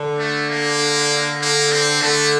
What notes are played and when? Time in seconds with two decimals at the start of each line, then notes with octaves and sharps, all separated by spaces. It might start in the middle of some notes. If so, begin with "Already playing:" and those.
Already playing: D3
0.19 A3
0.49 A#3
1.42 A#3
1.72 C4
2.02 D3 A3